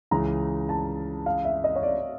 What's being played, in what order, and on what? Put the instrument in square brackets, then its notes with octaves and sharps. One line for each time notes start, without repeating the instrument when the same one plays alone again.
[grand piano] C#2 C#3 E3 [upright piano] A#5
[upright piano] A5
F5
E5
D#5
C#5
D5